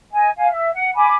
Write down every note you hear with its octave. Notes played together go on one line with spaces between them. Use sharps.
D#5 G#5
F5 G#5
E5
F#5
G#5 B5 D6